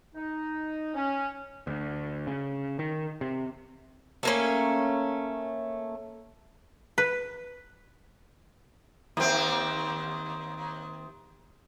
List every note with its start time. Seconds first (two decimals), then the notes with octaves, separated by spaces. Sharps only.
0.14 D#4
0.94 C#4
1.67 D2
2.27 C#3
2.79 D#3
3.21 C3
4.23 A3 A#3 C#4
6.98 B4
9.17 D#2 C4